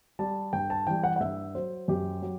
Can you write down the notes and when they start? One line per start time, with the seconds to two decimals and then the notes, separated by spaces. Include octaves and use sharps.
0.19 G3 A5
0.53 G2 G5
0.70 A5
0.87 E3 G3 G5
1.04 F#5
1.16 F#5
1.20 G2 E5
1.55 F#3 C5
1.88 F#2 G4
2.22 F#3